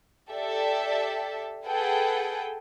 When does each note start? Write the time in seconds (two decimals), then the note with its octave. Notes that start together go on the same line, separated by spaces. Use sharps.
0.31 G4 A4 D5 E5
1.65 G#4 A4 B4 F#5 G5